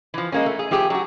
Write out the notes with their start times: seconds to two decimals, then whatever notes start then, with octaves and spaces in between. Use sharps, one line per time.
0.14 E3 F3
0.32 G#3 A#3 C#4
0.46 A3
0.59 G#4
0.71 F3 A3 G4 G#4
0.90 F#3 F#4